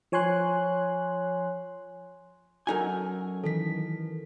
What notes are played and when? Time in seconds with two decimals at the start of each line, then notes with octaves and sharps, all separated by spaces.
0.12 F3 C#5 G#5 C6 F#6
2.67 F#2 D#4 F#4 A4 A#4 G#5
3.44 D#3 E3 A4 B6